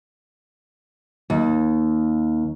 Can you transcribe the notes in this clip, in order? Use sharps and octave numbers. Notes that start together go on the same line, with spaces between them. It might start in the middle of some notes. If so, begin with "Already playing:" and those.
D#2